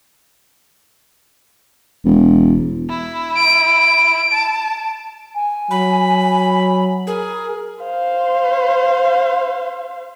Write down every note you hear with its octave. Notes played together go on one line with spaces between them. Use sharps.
E1
E4
D7
A5
G#5
F#3 B5
G#4 A#4
C5 F5